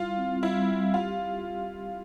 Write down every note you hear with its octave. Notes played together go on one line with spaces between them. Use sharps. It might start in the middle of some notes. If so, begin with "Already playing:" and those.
Already playing: G3 E4 F4
C4
G3 E4
G3
F4 G4